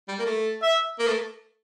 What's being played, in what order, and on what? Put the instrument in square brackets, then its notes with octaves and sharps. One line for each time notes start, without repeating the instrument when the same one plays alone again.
[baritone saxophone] G3
A#3
A3
[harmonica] E5
[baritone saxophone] A#3
A3